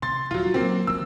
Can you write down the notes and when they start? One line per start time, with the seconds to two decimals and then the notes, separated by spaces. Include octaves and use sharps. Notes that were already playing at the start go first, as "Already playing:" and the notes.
0.02 C3 C6 A6
0.31 D#1 F#3 F4
0.54 F#3 A#3 C4
0.87 D3 G3 E6